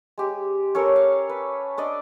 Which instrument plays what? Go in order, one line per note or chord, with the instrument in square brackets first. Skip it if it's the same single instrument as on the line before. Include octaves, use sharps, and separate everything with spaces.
[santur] G#3 G4
C#4 A4 A#4 C#5
F5
B4
D4 D5 D#5 D6